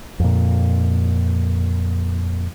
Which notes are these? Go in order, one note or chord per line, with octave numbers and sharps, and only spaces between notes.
F2 A#2